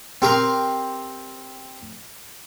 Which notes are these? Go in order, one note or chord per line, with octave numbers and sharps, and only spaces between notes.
C4 G4 A#4 C6